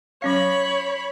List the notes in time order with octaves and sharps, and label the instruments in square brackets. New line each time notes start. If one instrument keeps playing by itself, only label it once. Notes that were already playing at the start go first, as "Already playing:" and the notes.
[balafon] F#3 C#4 F5 [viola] C#5 B5